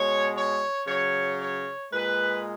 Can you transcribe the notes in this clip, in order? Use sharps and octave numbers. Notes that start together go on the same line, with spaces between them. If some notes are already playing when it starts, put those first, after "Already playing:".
Already playing: B2 G#3 C#5
C#5
C#3 F#3 C#5
C#5
A#2 G#3 B4